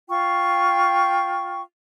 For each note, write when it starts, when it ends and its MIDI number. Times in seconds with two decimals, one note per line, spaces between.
0.09 1.61 65
0.09 1.61 79
0.09 1.61 85